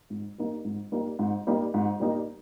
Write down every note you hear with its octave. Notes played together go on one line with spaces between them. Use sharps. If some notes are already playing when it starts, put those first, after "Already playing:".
G#2
G3 A#3 D#4
G#2
G3 A#3 D#4
G#2
G3 A#3 D#4
G#2
G3 A#3 D#4